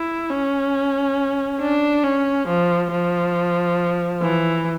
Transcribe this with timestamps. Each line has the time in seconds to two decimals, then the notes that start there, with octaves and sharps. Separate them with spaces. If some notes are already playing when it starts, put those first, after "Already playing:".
Already playing: E4
0.30 C#4
1.60 D4
2.03 C#4
2.47 F3
2.91 F3
4.21 E3